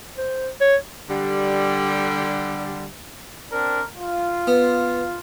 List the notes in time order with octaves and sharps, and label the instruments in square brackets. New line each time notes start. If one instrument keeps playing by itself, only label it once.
[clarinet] C5
C#5
[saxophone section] D3 G3
[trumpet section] C4 D4 A#4
F4
[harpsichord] B3